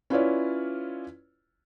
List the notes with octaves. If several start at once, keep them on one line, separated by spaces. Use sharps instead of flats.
C#4 E4 F4 B4 C#5 D5